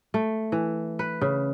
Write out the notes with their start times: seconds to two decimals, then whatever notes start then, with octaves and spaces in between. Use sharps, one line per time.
0.14 A3
0.52 E3
0.99 B4
1.21 C#3